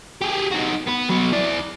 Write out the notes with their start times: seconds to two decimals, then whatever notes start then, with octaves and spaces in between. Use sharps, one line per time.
0.21 G4 G#4
0.51 D#4 F#4
0.87 B3 B4
1.10 F#3 B3
1.33 E4 D5